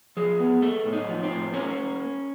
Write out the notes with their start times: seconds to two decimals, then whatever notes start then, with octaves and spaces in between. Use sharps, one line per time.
0.17 F3 G#4
0.40 B3
0.62 A#3 A4
0.85 A2
0.93 D#4
1.09 F3
1.23 C4
1.30 A2
1.54 A#3 C#4